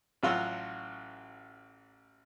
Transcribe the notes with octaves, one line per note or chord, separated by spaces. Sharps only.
A1 F#3 F4 F#4 E6